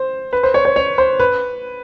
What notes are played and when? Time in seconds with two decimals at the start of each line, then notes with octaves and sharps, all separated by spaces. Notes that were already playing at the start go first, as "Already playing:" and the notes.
Already playing: C5
0.33 B4
0.43 C5
0.54 C#5
0.65 C#5
0.76 C#5
0.98 C5
1.20 B4